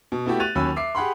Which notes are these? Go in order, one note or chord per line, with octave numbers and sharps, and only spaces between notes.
B2
A3 B3 E4 F#4 G4
F#6 A6 D#7 F7
D#2 F#3 C#4 B5 E6 D#7
E5 D6 C7
G4 G#4 F#5 B5 C6